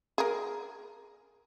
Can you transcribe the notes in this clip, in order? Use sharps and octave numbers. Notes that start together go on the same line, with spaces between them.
G#4 A#4